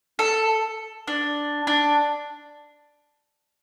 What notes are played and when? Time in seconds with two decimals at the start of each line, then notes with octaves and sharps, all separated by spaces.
0.19 A4
1.07 D4
1.67 D4